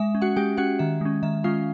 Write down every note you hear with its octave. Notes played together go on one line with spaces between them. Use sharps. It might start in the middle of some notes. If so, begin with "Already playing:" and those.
Already playing: G#3 E5
C#4
F#4 F#5
G#3 G4 G5
C#4 F#4 F#5
D#3 E5
G#3 C#4
D#3 E5
G#3 C#4 F4 F5